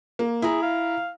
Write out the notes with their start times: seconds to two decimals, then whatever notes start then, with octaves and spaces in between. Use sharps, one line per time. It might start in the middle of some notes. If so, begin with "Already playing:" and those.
0.19 A#3
0.42 E4 G#4 A#5
0.62 F5